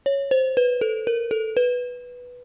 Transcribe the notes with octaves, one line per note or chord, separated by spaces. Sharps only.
C#5
C5
B4
A4
A#4
A4
B4